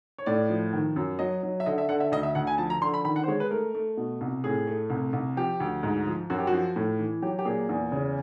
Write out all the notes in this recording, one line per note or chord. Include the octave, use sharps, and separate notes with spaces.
C#5
A2 D5
F3
D#3
F#2
F#3 D#5
F#3
E5
D3 D#5
E5
D3 F#5
E5
D2 D#5
E5
D2 F#5
G#5
F3 A5
A#5
D3 C6
B5
D#3 B5
F#5
C5
G#3 C#5
B4
A3 A#4
A3
B2
C2
A2 G#4
A3
C2
C2
F3 G4
D2
G#2
F3
F#2 F#4
G4
F#4
F3
A2
E3
F#3 G4
G4
A#2 G#4
E2
C#3